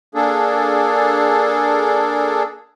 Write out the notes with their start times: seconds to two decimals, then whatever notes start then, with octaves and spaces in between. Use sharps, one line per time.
0.15 A#3 D4 G#4 A4